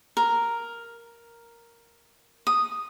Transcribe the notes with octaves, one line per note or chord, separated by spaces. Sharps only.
A#4
D#6